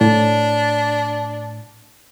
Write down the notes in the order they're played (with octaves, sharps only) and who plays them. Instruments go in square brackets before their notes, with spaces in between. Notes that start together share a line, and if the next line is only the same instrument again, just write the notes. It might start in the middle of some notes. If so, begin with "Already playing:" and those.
[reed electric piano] A2 [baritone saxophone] D4